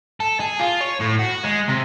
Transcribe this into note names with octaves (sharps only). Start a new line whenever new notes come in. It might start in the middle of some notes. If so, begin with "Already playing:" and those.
A4
G#4
F4
C#5
A2
F#4
G#3
C3